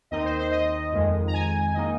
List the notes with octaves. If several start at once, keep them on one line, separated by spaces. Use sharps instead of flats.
D#2 D#3 C4 D#4 D#5
C5
C5
D#5
F2 D#3 G#3
A#5
G#5
D#3 A#3 D#4 D#5